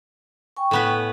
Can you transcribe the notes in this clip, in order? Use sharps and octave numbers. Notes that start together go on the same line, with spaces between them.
G5 G#5 C#6
A2 B3 B4